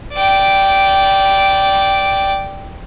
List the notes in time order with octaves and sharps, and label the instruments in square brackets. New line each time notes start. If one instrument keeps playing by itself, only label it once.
[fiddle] D5 G5